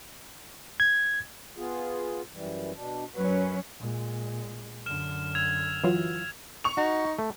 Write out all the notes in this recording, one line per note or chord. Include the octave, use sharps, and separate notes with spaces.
G#6
B3 F4 G#4
F#2 E3 G3
B2 D4
F#2 F#3 C#4 B4
A#2 G#3
F#2 D3 F6 E7
E6 G#6 F7
E3 F#3 F4
C#6 F7
D#4 F#4
A3